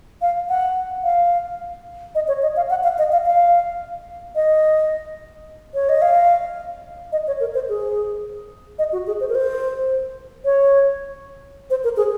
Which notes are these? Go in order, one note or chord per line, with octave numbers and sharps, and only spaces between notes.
F5
F#5
F5
D#5
C#5
D#5
F5
F#5
F5
D#5
F5
F5
D#5
C#5
D#5
F5
D#5
C#5
A#4
C5
G#4
D#5
F#4
G#4
C5
A#4
C5
C#5
C5
A#4
G#4